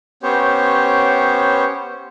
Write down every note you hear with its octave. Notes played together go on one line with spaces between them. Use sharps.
B3 C#4 G4 C5 C#5